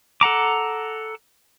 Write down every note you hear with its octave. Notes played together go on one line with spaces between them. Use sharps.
A4 F#5 A#5 D6